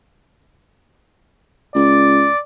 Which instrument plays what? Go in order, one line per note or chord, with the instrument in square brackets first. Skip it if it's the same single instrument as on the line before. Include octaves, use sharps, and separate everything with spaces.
[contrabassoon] C#2 [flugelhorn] D5